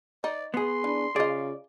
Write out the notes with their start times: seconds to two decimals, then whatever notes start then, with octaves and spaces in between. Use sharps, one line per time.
0.24 D#4 D5
0.54 B3 G#4 C6
0.84 E3 D4
1.16 C#3 F4 G#4 D5 D#5